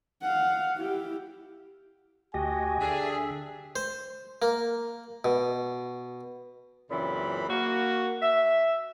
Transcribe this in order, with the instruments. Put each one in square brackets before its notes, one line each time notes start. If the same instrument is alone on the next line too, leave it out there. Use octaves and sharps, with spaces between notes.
[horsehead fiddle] F5 F#5
E4 G4
[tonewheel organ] D2 F#4 D#5 [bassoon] G4 [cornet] G#5
[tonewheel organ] D3 E5 [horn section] D4 G#4
[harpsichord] C5
A#3
B2
[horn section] F#2 A#2 C#3 E3 C4 B5
A#3 F#4
E5